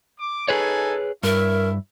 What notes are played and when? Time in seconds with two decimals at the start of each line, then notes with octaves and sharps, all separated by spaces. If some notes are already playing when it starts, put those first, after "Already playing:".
0.19 D6
0.48 D#4 G#4 A4 B4 C#5 G#5
1.23 G2 E4 A#4 C#5 E5